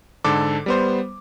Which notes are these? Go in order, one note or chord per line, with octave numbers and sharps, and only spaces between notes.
G#2 D3 A4 D6
G3 B3 C5